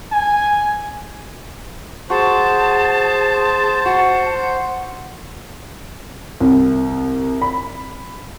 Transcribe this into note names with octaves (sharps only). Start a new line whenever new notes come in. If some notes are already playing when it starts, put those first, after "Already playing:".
G#5
F#4 G#4 C5 A5
F#4 F#5
C2
B5